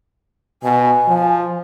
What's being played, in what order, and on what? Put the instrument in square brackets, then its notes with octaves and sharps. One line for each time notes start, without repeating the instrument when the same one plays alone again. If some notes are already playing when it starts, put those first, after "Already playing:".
[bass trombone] B2 [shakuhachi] G#5
[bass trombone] F3